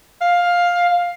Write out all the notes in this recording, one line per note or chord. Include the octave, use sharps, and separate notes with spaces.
F5